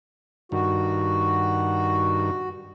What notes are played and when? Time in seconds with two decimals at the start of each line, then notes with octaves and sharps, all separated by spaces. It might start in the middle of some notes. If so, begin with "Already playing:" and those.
0.52 G2 D#3 F#4